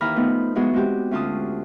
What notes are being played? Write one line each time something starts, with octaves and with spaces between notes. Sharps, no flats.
D#2 E3 G#5 A#5 B5 F6
F3 A3 B3 D#4
E3 F#3 G#3 B3 G#4 C#5
G#3 C4 F#4 G4
D2 C#4 F4 A5 D#6